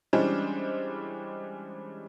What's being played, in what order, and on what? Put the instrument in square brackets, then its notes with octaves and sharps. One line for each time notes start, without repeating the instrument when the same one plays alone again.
[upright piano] E3 G3 G#3 C#4 D4 C5